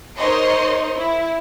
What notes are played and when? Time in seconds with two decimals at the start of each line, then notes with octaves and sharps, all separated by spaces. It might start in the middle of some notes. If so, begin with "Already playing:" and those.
0.18 D#4 A#4 C5 C#5 D#5 C6
0.96 E4